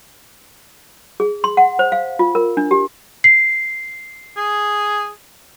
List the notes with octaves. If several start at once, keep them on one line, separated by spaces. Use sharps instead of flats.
G#4
C6
F#5
C5
F5
F4
A#4
D4
G4
C7
G#4